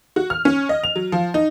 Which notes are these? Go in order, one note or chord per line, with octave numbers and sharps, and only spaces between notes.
F#4
F6
C#4
D#5
F7
F#3
F3
D#4